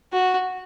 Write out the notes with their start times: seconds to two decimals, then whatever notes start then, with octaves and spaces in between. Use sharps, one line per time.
0.13 F#4